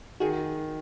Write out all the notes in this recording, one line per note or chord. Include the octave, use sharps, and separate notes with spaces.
D#3 F#4 G#4